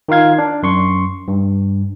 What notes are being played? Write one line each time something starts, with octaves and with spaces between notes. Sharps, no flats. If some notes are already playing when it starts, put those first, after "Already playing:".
D#3 D#4 F4 F5 G#6
D4
F#2 C6 C#6
G2